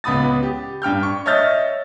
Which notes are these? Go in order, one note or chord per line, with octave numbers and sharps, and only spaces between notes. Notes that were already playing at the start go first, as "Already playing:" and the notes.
C#2 B3 B5 D#6 A6
G4
G2 G5 F6 G6
C#6
C#5 D#5 E5 F6 G6 A6